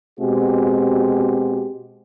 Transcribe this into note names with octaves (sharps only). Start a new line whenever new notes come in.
B2 G#3 C4 F#4 G4